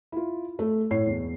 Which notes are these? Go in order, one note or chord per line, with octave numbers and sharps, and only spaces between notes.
E4 F4
A3
A2 C#5 C7
E1